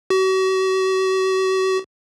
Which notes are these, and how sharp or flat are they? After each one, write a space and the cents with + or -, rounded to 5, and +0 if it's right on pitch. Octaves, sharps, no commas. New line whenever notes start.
F#4 +40